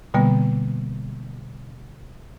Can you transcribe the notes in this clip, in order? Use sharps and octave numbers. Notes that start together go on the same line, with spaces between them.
B2 D3 G3 A#3 B3